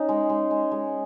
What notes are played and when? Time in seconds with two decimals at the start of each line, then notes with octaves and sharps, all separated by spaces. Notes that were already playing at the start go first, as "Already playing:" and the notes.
Already playing: C#4 D#4
0.09 G#3
0.29 G#3
0.51 G#3
0.71 G#3